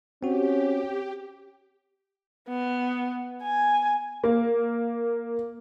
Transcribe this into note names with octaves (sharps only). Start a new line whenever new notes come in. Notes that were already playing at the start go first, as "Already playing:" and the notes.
C4 C#4 F#4 G4
B3
G#5
A#3